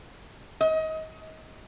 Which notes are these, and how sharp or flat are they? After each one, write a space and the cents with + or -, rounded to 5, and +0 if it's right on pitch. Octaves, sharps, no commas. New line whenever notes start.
D#5 +25